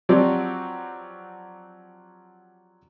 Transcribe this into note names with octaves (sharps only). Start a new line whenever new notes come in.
F3 F#3 C4 F#4 G4 D5